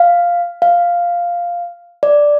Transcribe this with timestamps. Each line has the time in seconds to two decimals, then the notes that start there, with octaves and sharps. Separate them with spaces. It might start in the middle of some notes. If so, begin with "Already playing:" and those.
Already playing: F5
0.62 F5
2.03 D5